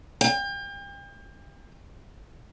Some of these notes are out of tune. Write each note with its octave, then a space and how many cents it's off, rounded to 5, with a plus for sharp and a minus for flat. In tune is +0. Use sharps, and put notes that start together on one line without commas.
G5 +35